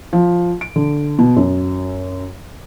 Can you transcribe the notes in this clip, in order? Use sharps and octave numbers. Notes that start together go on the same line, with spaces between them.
F3
D7
D3
B2
F#2